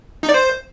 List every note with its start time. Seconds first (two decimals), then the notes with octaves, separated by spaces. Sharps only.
0.23 D#4
0.29 D5
0.34 C5